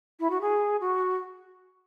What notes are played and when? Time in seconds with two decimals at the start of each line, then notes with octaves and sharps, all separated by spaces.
0.20 E4
0.30 F#4
0.41 G#4
0.81 F#4